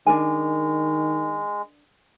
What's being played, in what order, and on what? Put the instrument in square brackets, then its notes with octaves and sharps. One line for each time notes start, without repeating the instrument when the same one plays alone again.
[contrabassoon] D#3 [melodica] G#3 [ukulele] D4 A#4 G#5